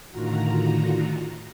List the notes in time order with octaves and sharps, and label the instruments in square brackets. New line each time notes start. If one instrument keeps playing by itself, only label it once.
[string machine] A2 D3 D#3 F4 F#4 A#5